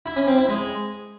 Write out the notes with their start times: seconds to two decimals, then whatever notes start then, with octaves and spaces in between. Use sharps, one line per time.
0.06 E4
0.16 C#4
0.27 C4
0.38 E4
0.48 G#3